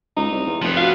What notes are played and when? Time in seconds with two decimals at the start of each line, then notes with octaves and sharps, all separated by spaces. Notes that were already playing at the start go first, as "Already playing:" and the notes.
0.17 C#2 D#4
0.31 C2
0.47 E2
0.62 F1 F3 B3
0.77 F4 F#4 F5